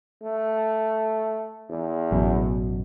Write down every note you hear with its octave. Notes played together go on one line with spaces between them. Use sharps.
A3
E2
A1 F#2 B2